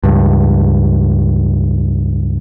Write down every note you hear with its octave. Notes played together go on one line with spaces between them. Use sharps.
C#2 G2